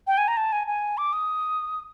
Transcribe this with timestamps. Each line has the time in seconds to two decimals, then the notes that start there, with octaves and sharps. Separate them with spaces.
0.07 G5
0.18 G#5
0.28 A#5
0.37 A5
0.52 G#5
0.67 G#5
0.98 D6
1.13 D#6